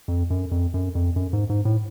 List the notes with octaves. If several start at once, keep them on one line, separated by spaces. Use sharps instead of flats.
F2
F#2
F2
F#2
F2
F#2
G#2
G#2
A2